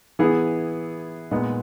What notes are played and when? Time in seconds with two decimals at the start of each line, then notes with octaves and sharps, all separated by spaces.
0.19 E3 B3 E4 G#4
1.31 A#2 G#3 B3 D#4